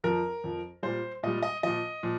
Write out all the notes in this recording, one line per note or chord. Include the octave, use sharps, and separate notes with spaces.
F2 F3 A#4
F2 F3
A#2 G3 C5
A#2 G3 D#5
D#5
A#2 F3 D#5
A#2 F3